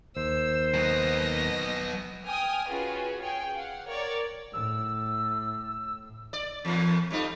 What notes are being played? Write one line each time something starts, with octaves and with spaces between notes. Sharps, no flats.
D#2 C5 E6
F#3 B3 D#5 A#6
G5 G#5 D#6 F6
C#4 F4 F#4 G#4 B4
G#4 C#5 G5
F5 F#5
A#4 C#5 D5
A2 E6
D5
E2 A#2
F2 G3 D#4